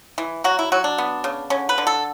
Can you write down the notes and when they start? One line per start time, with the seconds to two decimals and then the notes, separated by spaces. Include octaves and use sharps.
0.18 E3
0.44 F#3 F#4
0.59 E4
0.72 F#3 F#4
0.84 D4
0.98 B3
1.24 C#3
1.50 D3 C#4
1.69 B4
1.78 D3
1.87 A4